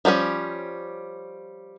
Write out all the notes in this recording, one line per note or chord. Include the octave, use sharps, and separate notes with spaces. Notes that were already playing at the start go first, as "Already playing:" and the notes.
F3 G3 B3 C#4